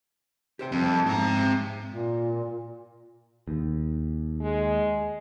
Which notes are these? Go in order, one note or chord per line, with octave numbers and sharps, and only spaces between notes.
G4 C5 G5
F2 G3 C4
G#2 C4 A#5
A#2
D#2
G#3